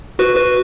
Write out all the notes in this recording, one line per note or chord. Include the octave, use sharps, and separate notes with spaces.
F#4 B4
F#4 B4